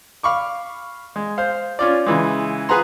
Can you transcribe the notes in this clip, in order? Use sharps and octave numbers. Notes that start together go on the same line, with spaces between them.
F5 B5 C#6 D6
G#3
C5 F5
C#4 F4 D5
C#3 E3 G#3
F4 G#4 B4 F#5 A#5 C6